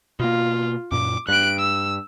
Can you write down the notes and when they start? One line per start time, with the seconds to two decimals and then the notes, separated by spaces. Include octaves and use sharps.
0.20 B2 A#3 F4
0.92 F#2 A#2 D6
1.28 G2 F#6 D7
1.60 E6